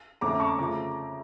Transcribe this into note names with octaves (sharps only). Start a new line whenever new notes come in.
F2 D3 A3 C#4 A#5 D6
A5 C#6
C#3 F3 A3 A#5 D6